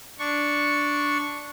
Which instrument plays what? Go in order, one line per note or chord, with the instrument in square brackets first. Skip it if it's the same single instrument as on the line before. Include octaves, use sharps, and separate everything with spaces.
[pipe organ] D4 C#6